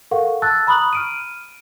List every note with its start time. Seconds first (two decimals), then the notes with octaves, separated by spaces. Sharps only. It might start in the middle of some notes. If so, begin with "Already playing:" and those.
0.11 A4 A#4 F5 F#5 C#6
0.42 A5 E6 F#6 A6
0.67 A#5 B5 C#6 D#6 F#6 F#7
0.93 F6 D7 D#7